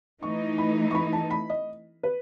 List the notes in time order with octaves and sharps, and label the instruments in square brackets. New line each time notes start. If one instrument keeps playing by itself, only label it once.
[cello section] E3 A3 D#4 [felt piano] C#6
[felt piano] B5
C#6
B5
A5
B5
D#5
B4